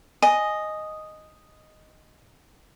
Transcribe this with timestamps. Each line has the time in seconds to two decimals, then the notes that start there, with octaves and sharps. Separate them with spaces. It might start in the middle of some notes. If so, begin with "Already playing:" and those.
0.22 D#5 G#5